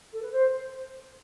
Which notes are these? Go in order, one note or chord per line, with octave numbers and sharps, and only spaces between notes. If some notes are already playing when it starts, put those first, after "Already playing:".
A4
B4
C5